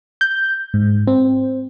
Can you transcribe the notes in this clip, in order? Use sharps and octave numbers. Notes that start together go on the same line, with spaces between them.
G6
G#2
C4